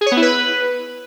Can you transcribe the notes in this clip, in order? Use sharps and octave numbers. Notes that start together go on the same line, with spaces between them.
G#4
C#5
B3
E4
B4